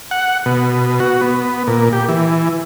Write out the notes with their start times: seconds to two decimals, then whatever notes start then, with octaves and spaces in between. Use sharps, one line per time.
0.11 F#5
0.46 B2
1.00 F#4
1.21 B3
1.67 A#2
1.93 G4
2.09 E3